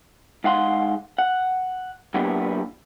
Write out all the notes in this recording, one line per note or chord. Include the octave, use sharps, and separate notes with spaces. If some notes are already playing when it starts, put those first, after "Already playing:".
G#2 F5 F#5 C6
F#5
F#3 A#3 B3 D4 E4 G4